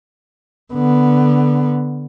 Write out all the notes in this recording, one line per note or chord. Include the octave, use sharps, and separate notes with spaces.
D3 B3